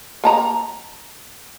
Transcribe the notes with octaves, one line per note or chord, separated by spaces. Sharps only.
A#3 A5 A#5